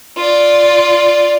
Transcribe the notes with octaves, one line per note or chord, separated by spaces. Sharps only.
F4 D5